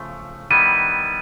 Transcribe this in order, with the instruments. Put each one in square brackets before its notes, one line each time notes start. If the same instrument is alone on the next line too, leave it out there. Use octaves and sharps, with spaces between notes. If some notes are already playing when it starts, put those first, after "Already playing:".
Already playing: [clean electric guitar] C#3 F3 A3
[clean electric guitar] D#3 G3 B3 E4 [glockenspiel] D#7